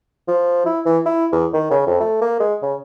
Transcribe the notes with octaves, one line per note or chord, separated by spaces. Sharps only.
F3
E4
E3
E4
E2
D#3
C#3
F2
A3
A#3
G#3
C#3